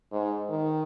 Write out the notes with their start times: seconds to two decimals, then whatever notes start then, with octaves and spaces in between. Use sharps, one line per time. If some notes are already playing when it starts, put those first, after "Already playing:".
0.12 G#2
0.49 D#3